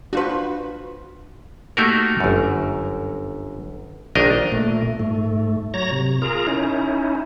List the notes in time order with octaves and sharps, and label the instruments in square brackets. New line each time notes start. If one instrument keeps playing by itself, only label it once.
[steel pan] D4 F4 C5 [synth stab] F#4 B4
[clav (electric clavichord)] A3 A#3 D#4 F#4 G4 A#4
G1 F#2
A#1 D#3 D4 A#4 D#5
[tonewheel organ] A#2 A3
G#2 A3
F#3 C#5 A#5 A#6
C3
F4 G#4 A#4 A#5
C#4 D#4 E4